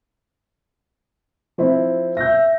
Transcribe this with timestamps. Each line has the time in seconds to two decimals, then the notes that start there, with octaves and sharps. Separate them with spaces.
1.58 F3 C4 E4
2.17 E5 G6 A#6